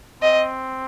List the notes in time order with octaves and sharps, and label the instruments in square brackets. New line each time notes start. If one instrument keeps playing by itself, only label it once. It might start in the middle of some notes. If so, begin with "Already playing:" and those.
[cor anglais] C4 [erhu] D#5